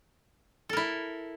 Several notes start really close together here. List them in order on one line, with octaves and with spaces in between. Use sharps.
A4 A#4 E4